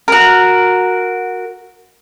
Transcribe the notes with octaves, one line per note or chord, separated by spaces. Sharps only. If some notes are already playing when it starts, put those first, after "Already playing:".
F#4 A#4